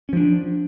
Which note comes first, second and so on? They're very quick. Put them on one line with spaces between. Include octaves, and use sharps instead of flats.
C#4 F3 D4